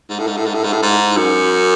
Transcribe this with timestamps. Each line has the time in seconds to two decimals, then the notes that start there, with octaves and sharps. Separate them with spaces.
0.10 G#2
0.19 A2
0.27 G#2
0.37 A2
0.46 G#2
0.55 A2
0.64 G#2
0.73 A2
0.83 G#2
1.17 F#2